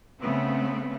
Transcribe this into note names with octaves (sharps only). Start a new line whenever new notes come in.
C#3 A3 B3 C4